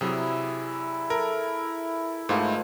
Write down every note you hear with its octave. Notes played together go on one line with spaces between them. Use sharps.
C3 F#3 E4 G#4 D5
A4 A#4
G#2 D#3 F3 A3 B4